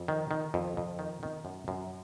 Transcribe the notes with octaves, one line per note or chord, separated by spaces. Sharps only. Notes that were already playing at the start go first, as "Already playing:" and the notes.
Already playing: F2
D#3
D#3
F2
F2
D#3
D#3
F#2
F#2